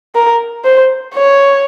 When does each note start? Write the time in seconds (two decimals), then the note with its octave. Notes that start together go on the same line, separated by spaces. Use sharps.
0.15 A#4
0.65 C5
1.15 C#5